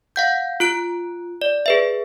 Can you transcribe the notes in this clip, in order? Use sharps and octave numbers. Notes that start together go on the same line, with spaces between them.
F5 F#5 G6
F4 F#6 D7
D5
G#4 B4 E5